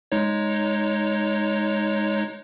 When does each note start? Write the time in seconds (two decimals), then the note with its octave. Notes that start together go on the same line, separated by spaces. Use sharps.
0.12 G#3 D#4 C#5